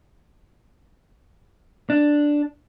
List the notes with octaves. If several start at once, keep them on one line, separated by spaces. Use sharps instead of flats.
D4